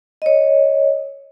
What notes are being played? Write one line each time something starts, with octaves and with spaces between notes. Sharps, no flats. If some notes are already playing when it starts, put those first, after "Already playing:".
C#5 D#5